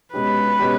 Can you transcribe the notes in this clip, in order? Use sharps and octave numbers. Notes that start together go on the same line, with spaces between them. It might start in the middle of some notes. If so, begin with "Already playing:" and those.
B2 G#3 C#4 G4 B4
B2 G#3 C#4 G4